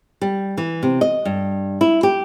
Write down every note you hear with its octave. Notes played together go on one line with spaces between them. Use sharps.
G3
E3
C3
D#5
G2
E4
G4